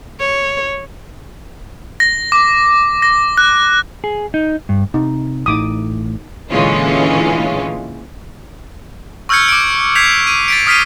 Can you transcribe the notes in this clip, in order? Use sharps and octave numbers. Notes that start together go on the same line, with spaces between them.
C#5
A#6
D6
A#6
F#6
G#4
D#4
G2
C3 D#4
A1 A2 D#4 D6 D#6
A#2 D3 E3 G#3 C#4 F4
C#6 E6 F6 G6 G#6 C#7
D6 D7
G6 G#6 B6 C7 F7
D#7
A6 B6 D7
D#6 F6 B6 C7 D#7